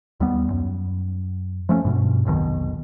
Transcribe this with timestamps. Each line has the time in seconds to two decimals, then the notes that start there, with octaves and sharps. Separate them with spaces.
0.20 D#2 G3 B3
0.50 F#2
1.69 F3 A3 C#4
1.85 G2 B2
2.25 F1 B1 B2 D#3